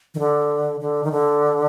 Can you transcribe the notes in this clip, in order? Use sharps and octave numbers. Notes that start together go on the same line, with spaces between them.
D#3
D3
D3
D#3
D3